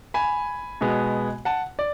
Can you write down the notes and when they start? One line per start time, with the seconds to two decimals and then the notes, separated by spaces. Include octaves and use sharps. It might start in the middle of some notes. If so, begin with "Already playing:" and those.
0.14 G#5 B5
0.81 B2 G#3 B3
1.45 F#5 A5
1.79 D5